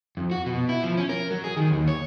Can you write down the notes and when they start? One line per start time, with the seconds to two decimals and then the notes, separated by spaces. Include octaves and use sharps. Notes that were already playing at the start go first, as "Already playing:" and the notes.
0.17 F2
0.31 F#4
0.46 B2
0.69 E4
0.83 F3
0.97 C#4
1.09 A#4
1.31 F#3
1.44 G#4
1.57 D#3
1.71 D#2
1.88 C#5